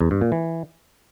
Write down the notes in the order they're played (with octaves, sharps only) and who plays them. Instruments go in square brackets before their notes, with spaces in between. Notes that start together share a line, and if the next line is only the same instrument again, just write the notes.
[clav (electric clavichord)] E2
G2
A#2
E3